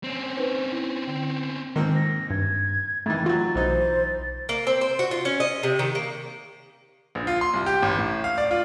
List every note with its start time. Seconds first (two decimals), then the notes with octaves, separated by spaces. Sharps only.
0.04 C4 C#4
0.37 D#4 B4 C5
0.72 E4
1.07 D3 G5
1.76 G#2 D#3 A#3 C4
1.96 A#6
2.30 G2 G#6
3.06 F2 D#3 E3 A3 A6
3.26 F#3 F4 F#4
3.55 B1 E3 D#4 C5 A6
4.49 A#3
4.67 C4
4.81 C5
4.99 F#4
5.11 F4
5.25 C#4
5.40 D#5
5.63 C3
5.79 D#3
5.95 A#3
7.15 A#1
7.27 F4
7.41 C6
7.54 C2
7.66 G4
7.82 A1
7.98 A2
8.24 F5
8.38 D5
8.51 F4